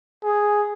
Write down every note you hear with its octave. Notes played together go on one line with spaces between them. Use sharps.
G#4